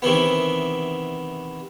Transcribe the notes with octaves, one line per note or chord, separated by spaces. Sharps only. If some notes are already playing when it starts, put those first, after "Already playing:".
C3 D#3 E3 B3